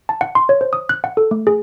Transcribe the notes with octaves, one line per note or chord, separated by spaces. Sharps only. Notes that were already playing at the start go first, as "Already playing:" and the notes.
A5
F#5
C6
C#5
C5
D#6
F#6
F#5
A4
A3
G#4